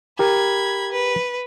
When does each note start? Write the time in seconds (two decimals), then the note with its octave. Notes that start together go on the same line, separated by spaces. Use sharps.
0.19 G4 A#4 B5 G#6
0.92 B4